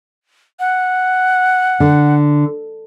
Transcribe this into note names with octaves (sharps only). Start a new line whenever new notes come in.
F#5
D3